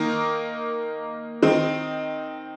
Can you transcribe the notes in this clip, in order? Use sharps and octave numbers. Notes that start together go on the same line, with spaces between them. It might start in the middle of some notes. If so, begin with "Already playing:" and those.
Already playing: D#3 A#3 D#4 A#4
D#3 C4 D#4